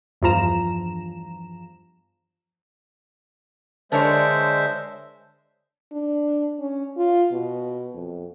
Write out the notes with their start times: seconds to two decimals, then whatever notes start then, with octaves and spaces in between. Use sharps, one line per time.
0.22 E2 G2 F3 A#5 E7
3.92 D3 G#3 D4 A#4 C5 C#5 E5
5.93 D4
6.60 C#4
6.98 F4
7.32 B2
7.94 F2